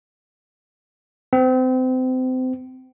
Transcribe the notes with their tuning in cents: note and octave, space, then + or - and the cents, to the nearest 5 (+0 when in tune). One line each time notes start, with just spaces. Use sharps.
C4 -30